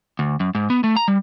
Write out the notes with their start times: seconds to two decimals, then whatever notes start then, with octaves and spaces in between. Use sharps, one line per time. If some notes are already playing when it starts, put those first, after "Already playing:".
0.19 D2
0.40 F#2
0.55 G#2
0.70 B3
0.84 A3
0.96 A#5
1.08 G3